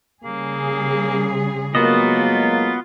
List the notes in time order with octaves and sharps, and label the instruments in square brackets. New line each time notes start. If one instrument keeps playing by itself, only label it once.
[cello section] C#3 G3 G#4 [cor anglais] A#3
[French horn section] F#3 G#3 A#3 [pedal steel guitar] B3 F#4 D#5 [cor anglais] F4